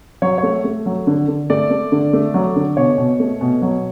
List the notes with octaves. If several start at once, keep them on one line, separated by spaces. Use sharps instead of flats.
F#3 C#5
C#5
A3
A3
F#3
D3
D3
A3 D5
A3
D3
A3
F#3
D3
B2 C#5
B2
A3
B2
F#3